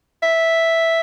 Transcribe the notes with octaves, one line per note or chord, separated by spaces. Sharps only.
E5